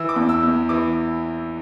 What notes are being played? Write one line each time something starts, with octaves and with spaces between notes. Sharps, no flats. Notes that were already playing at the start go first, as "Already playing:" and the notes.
Already playing: E3 E6
D6
E2
E6
E2
E3 D6